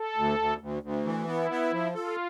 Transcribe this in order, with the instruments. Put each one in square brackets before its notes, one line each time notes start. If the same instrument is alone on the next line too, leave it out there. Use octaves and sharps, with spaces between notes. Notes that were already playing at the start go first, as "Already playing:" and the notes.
Already playing: [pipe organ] A4
[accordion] D2
D2
D2
D2
E3
[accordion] B3 [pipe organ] E4
[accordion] B3
F3
[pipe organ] F4 [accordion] A4